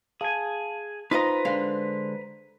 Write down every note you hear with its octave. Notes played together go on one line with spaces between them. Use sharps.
G#4 F5 G#5 A5
D#4 F4 B4 C5 D#5 A#5 C6
D3 G#3 F5